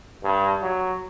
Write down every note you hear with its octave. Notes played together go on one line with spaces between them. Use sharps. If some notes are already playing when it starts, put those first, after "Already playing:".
G2
F#3